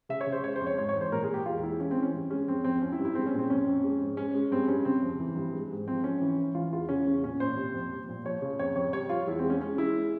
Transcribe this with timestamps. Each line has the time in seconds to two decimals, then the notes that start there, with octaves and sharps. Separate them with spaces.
0.09 C#3 E5
0.21 C#5
0.27 C#3
0.32 C5
0.43 G#3 C#5
0.56 C5
0.60 F2
0.67 C#5
0.78 G#2 C#5
0.89 C#5
0.95 E3
1.01 C5
1.12 A#2 A#4
1.23 G#4
1.29 G#3
1.34 G4
1.46 E2 F4
1.63 G#3 E4
1.80 E3 C#4
1.91 C4
1.97 E3
2.03 C#4
2.14 G2
2.30 G#3 C#4
2.48 F2 C4
2.64 F2 C4
2.81 F3 C#4
2.92 E4
2.99 G2
3.05 E4
3.15 G#3 C4
3.26 C#4
3.33 A#2
3.39 C4
3.49 F2 C#4
3.67 F2
3.84 G#3
4.00 G#2
4.17 G#3 C#4
4.34 G#3
4.52 G2 C4
4.68 G2 C#4
4.85 C#3 C4
5.02 F2
5.20 E3
5.36 G2
5.54 G#3
5.71 G#2
5.87 F3 C4
6.04 F3 C#4
6.21 E3
6.38 E3
6.55 E3 F4
6.73 E2 F4
6.89 C#3 C#4
7.06 E2
7.23 A#2 C#4
7.40 A#2 C5
7.57 C3
7.74 F2
7.91 G3
8.09 A#2
8.25 F3 C#5
8.42 C#3
8.59 F2 C#5
8.76 F2 C#5
8.93 G3 C#5
9.09 G3 F4
9.27 E2 E4
9.39 C4
9.44 G#3
9.50 C#4
9.60 G#3 C#4
9.78 G#3 E4